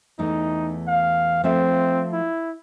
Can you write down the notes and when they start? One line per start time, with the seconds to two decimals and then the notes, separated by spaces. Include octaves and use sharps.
0.19 E2 E3 A3 D#4
0.88 F5
1.44 F3 A3 C4 E5
2.12 E4